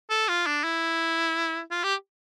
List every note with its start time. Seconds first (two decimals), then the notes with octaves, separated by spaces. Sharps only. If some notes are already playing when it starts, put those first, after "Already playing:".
0.10 A4
0.29 F4
0.47 D4
0.64 E4
1.71 F4
1.84 G4